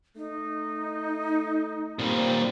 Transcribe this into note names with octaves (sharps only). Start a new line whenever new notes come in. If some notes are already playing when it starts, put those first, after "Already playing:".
A3 D#4
A#2 G3 C4